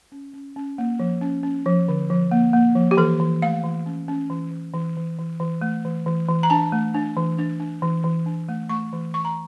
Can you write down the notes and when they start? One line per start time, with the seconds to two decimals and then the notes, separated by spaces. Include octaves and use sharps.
0.12 C#4
0.33 C#4
0.56 C#4
0.78 A#3
1.00 F3
1.21 C#4
1.43 C#4
1.66 F3
1.88 D3
2.10 F3
2.31 A#3
2.53 A#3
2.75 F3
2.91 G4
2.97 E3 A4
3.20 E3
3.42 A3 F5
3.63 E3
3.86 C#4
4.08 C#4
4.30 E3
4.51 E3
4.74 E3
4.96 E3
5.19 E3
5.40 E3
5.62 A3
5.85 E3
6.06 E3
6.28 E3
6.43 A#5
6.50 D4 A5
6.72 A3
6.94 D4
7.17 E3
7.38 D4
7.60 D4
7.82 E3
8.04 E3
8.26 D4
8.49 A3
8.69 A3 C#6
8.93 E3
9.14 E3 C#6
9.25 A#5